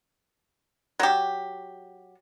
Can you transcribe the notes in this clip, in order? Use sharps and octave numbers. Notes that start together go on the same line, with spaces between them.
F#3 G4